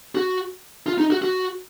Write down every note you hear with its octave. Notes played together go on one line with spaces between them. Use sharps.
F#4
F4
D#4
F#4
F#4